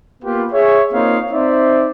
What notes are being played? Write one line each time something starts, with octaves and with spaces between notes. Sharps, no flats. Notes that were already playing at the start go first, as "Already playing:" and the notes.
A#3 B3 F4 G4 B4
G#4 C#5 E5
A#3 C4 D#4 F4 C#5 F5
C4 D#4 C5 D5 E5